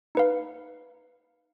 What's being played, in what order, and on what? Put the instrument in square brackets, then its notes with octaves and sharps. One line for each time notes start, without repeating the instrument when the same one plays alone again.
[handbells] D#4 B4 F5